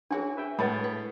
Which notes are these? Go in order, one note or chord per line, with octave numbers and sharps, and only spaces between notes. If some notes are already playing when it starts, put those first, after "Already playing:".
C4 D4 F#4 G#4 C#5
B4 E5 G5
A2 F#3 G#3 B4 B5 A6
B4